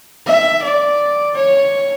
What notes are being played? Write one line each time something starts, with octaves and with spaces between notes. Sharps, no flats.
E5
D5
C#5